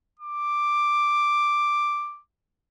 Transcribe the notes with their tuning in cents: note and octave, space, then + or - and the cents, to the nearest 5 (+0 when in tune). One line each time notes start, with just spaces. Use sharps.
D6 +5